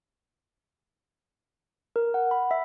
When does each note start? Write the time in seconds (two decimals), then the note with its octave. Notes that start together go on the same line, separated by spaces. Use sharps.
1.96 A#4
2.14 F#5
2.31 B5
2.51 E5